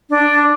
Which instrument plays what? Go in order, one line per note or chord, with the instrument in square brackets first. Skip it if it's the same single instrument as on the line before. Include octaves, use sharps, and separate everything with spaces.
[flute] D4